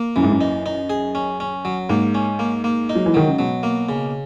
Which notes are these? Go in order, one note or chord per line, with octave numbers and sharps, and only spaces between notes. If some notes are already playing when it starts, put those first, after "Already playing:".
Already playing: A#3
F#2 E3
G#2
F#2
D#4
D#4
G#4
C#4
C#4
F#3
G#2 A#3
C#4
A#3
A#3
D#4
F#3
E3
D#3 F#3
C#3
B2 F#3
A#3
C#3